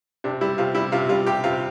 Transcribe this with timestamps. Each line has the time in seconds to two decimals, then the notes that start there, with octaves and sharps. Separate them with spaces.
0.24 C3 D4
0.41 G3 E4
0.58 C3 F4
0.75 G3 E4
0.92 C3 F4
1.09 G3 F4
1.26 C3 G4
1.44 C3 F4